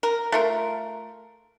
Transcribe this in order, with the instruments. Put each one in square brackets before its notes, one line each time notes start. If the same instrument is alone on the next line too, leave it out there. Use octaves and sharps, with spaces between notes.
[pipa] A#4
A3 F4 A#4